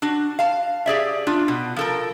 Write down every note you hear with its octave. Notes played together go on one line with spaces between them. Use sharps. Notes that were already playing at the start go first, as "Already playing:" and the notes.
D4 F#4
F5 A5
G4 G#4 D5 E5
D4 F4
B2
F3 A4 A#4